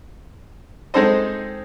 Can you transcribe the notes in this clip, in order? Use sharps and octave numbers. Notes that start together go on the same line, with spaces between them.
G#3 C4 D#4 A4 C5 D#5